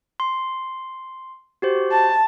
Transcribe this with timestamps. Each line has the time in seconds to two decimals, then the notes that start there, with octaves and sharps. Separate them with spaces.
0.20 C6
1.62 F#4 G4 C5
1.92 A5